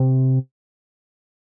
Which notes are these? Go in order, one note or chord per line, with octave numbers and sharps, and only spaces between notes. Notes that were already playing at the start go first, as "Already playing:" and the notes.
Already playing: C3